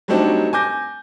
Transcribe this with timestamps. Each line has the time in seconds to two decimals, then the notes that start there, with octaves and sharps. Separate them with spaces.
0.08 F#3 G3 A3 C4 D4 D#4
0.53 G#5 D6 G6 A#6